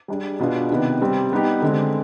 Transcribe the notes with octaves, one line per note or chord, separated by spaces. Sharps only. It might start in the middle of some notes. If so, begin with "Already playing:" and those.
G3 D4 G#4
B2 B3 D4 F4 G#4
C3 D#3 B3
C3 G3 C4
G3 B3 D#4 G4
D3 G#3 C4